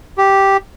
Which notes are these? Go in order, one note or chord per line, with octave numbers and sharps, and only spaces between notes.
G4